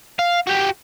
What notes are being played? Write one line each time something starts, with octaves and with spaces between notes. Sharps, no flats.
F5
F#4 G4